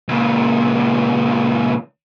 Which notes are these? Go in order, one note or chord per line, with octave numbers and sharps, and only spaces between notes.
C#2 A#2